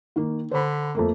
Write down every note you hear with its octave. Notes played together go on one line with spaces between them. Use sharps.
D#3 A#3
D3 C5 B5
F2 A3 A#3